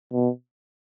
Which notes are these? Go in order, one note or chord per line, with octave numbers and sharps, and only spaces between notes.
B2